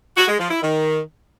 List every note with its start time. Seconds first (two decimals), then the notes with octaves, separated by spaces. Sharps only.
0.16 F#4
0.28 G#3
0.39 F3
0.50 E4
0.61 D#3